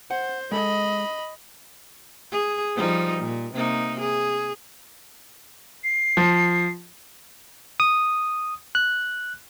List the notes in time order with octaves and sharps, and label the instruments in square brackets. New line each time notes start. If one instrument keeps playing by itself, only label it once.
[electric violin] C5 [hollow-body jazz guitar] F#5
[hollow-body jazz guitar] G#3 A4 [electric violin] D#5 B5
[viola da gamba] G#4
F3 G3 D#4
A#2
C3 A#3 D#4
G#4
[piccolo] C7
[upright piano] F3
[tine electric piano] D#6
F#6